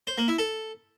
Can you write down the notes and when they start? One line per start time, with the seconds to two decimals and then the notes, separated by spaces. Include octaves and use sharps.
0.07 C5
0.18 A#3
0.28 E4
0.38 A4